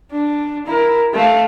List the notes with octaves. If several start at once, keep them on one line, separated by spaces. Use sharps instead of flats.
D4
E4 A#4
A3 F5